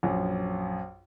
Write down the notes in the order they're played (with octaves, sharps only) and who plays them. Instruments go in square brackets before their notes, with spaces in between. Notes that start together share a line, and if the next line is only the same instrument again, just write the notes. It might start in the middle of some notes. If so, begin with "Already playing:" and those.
[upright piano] A#1 F#2